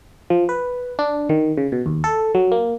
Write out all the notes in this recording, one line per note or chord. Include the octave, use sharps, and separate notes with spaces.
F3
B4
D4
D#3
C#3
B2
D#2
A4
F#3
A#3